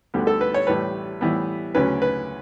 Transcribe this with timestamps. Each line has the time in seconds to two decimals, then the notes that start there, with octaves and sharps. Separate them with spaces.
0.14 D2 D3 G3 B3
0.27 A4
0.41 B4
0.54 C#5
0.67 A1 A2 G3 B4
1.21 A2 E3 G3 B3
1.75 D2 C#3 F#3 C#4 B4
2.02 B4